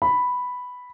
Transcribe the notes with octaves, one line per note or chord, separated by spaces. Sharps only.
B5